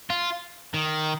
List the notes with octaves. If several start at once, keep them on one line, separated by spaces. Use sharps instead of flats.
F4
D#3